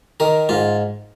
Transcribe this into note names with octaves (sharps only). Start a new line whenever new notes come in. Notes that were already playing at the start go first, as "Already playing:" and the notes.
D#3 A#4
G#2 F4